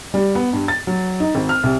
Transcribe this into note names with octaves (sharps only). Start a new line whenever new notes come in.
G3
B3
G2
A6
F#3
D#4
G#1
F6
C2